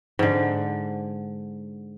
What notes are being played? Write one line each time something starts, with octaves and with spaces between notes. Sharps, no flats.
G#2 D3